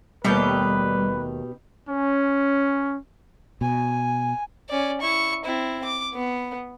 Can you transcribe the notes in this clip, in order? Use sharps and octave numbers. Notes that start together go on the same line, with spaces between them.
D#2 B2 G3 A3 D#4 G4 B4
C#4
B2 G#5
C#4 D5
E4 C#6
C4 E4
D6
B3